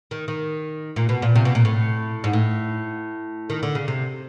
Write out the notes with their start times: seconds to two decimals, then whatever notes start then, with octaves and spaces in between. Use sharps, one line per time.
0.11 D#3
0.28 D#3
0.96 A#2
1.09 B2
1.22 A#2
1.35 C3
1.45 B2
1.55 A#2
1.65 A2
2.24 G#2
2.33 A2
3.50 D#3
3.63 D3
3.75 C#3
3.88 C3